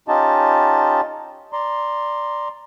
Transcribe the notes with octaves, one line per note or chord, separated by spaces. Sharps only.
C#4 D#4 F4 G4 D#5 A5
D5 A#5 C6